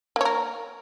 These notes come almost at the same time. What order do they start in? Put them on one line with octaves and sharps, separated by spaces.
A#3 C#5 A#4